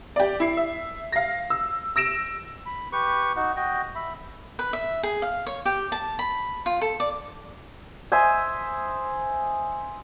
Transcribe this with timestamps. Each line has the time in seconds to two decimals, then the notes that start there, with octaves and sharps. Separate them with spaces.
0.16 G4 D5
0.40 E4 C7
0.57 E5
1.12 F5 A#6
1.50 E6
1.96 E6 A#6 D7 E7
2.66 B5
2.92 G4 B4 C#6
3.36 D#4 F#4
3.56 F#4 D#5 G5
3.95 E5 B5
4.59 B4
4.73 E5
5.03 G#4
5.22 F5
5.46 C#5
5.65 G4
5.92 A5
6.19 B5
6.66 F4
6.81 A4
7.00 D5
8.12 C5 D#5 E5 G#5